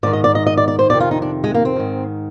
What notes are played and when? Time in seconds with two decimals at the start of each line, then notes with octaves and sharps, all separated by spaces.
0.03 G#2 D5
0.06 D#3
0.13 D#5
0.24 D5
0.35 D#5
0.47 D#5
0.57 D5
0.68 D5
0.79 C5
0.90 F2 C3 D#3 D5
1.00 F4
1.11 D#4
1.22 D4
1.44 G#3
1.55 A#3
1.65 C4
1.76 G#2 D#3